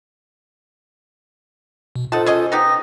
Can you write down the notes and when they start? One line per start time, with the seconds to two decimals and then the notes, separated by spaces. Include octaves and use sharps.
1.96 B2
2.12 D#4 F4 A4 C5 F#5 A5
2.26 C#4 G#4 D#5
2.52 B3 D#4 G4 D#6 A#6